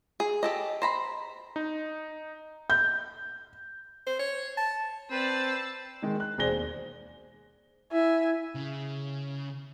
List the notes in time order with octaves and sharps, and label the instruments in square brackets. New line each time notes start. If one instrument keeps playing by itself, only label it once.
[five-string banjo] G#4
G4 A4 D#5
C5 A#5 B5
[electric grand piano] D#4
[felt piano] G6
[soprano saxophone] C5
C#5
A5
[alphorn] C4 [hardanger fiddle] B4 D5 [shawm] C5 [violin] A5 E6
[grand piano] D#3 G#3
F#6
E1 G#4 C5 D5 A#6 G7
D#2
[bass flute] E4 [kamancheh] E5 G#5
[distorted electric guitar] C#3